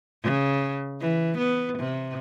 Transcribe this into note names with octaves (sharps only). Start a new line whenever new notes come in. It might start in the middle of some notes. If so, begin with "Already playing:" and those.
C#3
E3
B3
C3